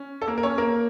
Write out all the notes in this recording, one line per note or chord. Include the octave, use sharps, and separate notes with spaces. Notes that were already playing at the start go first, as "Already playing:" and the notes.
Already playing: C#4
A4
A#3 A#4
A#4
C#4 C#5
A#3 A#4